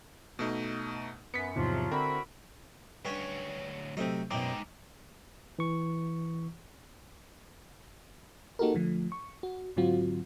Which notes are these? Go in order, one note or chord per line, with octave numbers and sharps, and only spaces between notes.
B2 A3 D#4
F#2 B3 B6 C#7
E2 G#2 C3 F3 F#3 F4
D3 C4 E4 F#4 A#4 B5
D2 G2 C#4 C#5
C3 F#3 A3 C4 D#4
F#2 B2 G#3 C4 D#4 D6
E3 C#6
A#3 D#4 F#4 G4 A4 A#4
D3 F3 A3
C#6
F#4
G#2 D3 F#3 C4 F4 F#4